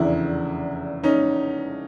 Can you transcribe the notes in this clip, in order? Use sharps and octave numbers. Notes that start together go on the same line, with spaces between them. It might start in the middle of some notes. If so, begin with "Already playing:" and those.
Already playing: F1 E2 C#3 D4 E4
C#4 D#4